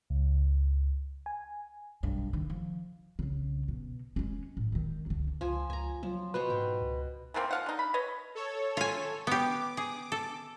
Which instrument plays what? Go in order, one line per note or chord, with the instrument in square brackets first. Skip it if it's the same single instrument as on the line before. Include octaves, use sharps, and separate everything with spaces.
[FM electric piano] C#2
G#5
[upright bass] B1 G2
D#3
F3
C2 C#3
B2
G#3 C#4
A2
D#3 G#3
C#2 D3
[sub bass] C#2 [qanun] F3 G#5
[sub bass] C#2 [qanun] G#5 A#5
[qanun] F3 [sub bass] F#3
[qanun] B2 C5 C#6 [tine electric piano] B4
[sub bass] G#2 [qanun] G5
[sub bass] C#2
[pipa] E3 A3 A#3 C4
F3 F5 F#5
D3 D#4
B5
B4 C#5 D#5
[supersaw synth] A4 C#5
[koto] F4 G#5
[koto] B3 G4 [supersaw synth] D6
[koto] G#4
A4